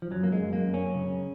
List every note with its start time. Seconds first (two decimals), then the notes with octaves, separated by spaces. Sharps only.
0.02 F3
0.11 F#2 F#3
0.23 A#3
0.32 G#3
0.39 F#2
0.53 A#3
0.67 F#2
0.74 C#4
0.94 C#3